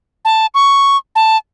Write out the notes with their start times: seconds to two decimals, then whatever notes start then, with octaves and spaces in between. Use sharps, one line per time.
0.25 A5
0.54 C#6
1.16 A5